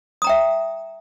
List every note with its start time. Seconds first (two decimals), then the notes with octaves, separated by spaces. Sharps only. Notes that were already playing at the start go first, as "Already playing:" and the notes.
0.22 D#6
0.24 A#5
0.27 G5
0.29 E5